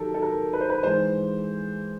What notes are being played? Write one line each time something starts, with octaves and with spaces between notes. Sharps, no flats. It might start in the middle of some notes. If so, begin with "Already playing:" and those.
Already playing: D#3 F#3 G4 A4 A#4
A4
A#4
B4
C5
B4
G#2 E3 G#3 C5